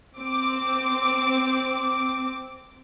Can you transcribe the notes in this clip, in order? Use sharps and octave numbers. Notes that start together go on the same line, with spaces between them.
C4 D6